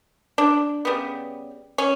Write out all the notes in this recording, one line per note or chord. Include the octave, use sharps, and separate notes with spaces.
D4
C#3 G3 B3
C#4